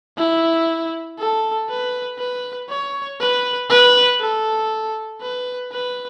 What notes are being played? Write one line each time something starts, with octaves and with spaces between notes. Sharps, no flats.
E4
A4
B4
B4
C#5
B4
B4
A4
B4
B4